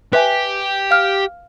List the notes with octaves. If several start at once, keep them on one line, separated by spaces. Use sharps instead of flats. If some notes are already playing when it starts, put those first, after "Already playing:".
G4 B4 E5 G#5
F5 F6